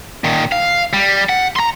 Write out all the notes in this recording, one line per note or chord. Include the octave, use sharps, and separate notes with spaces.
A#2 D#3
F5
G3
F#5
A#5 C6